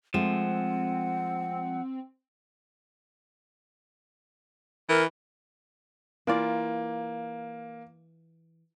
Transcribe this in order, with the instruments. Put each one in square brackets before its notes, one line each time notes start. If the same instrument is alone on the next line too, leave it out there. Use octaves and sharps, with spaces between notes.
[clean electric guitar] F3 [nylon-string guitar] G#3 A3 [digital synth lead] C4 [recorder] F#5
[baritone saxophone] E3 [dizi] A#4
[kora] E3 F4 D5 [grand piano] A#3